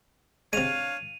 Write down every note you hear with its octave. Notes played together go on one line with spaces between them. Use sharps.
C3 G#3 D4 C#5 F5 D#7 F7